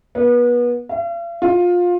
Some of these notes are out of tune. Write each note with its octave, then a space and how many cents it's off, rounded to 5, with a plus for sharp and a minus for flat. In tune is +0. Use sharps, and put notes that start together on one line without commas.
B3 -30
F5 -45
F4 +20